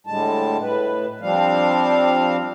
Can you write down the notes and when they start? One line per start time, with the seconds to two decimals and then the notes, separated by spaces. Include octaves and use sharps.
0.07 A2 D3 G3 G#3 A5
0.61 A2 B4
1.21 F3 G3 C4 D4 F5